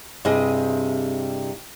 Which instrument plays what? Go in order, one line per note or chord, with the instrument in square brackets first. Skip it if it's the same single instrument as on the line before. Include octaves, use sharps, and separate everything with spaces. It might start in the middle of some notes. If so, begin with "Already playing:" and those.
[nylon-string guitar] G2 C3 E4 G#4 D#5